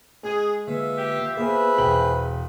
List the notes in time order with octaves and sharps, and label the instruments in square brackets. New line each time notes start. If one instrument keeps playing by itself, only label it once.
[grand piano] G#3 [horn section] G#4
[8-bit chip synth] D3 A#3 B4 [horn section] F4 E5
[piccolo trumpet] G4
[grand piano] A#3 B3 [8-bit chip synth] G#4 C5 G#5 [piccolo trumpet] B4
[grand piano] E1 G5 F#7